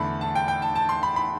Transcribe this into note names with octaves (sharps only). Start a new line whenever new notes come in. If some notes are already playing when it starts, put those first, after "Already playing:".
Already playing: E2 D3 A3 A5 B5
A5
G5
G5
A5
A5
C6
B5
B5